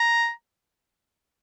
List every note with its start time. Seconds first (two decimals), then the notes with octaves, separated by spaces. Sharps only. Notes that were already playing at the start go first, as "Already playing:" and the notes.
Already playing: A#5